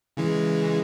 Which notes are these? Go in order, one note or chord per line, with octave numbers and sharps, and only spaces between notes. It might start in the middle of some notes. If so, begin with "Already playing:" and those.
C#3 E3 G#3